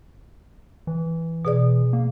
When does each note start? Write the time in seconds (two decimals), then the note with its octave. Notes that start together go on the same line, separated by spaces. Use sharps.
0.87 E3
1.45 B2 G#4 D5
1.93 A#3